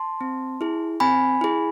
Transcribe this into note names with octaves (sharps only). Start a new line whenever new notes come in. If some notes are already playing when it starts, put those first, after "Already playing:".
Already playing: A5 C6
C4
E4 G#4
C4 G#5 B5
E4 G#4